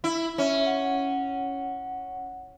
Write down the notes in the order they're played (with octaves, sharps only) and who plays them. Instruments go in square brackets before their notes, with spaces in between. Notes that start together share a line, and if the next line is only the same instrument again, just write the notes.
[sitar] E4
[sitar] C#4 [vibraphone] E5
[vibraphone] F#5